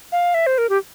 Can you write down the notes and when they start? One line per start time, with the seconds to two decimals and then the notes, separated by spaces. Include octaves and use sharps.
0.12 F5
0.34 E5
0.46 C5
0.58 A#4
0.69 G4